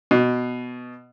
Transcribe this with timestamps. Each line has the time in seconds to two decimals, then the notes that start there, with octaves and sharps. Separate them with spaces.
0.11 B2